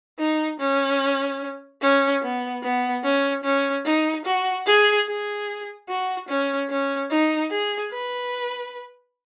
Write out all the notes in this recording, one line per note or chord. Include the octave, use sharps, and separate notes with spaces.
D#4
C#4
C#4
B3
B3
C#4
C#4
D#4
F#4
G#4
G#4
F#4
C#4
C#4
D#4
G#4
B4